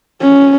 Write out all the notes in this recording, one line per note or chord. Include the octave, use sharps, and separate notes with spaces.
C#4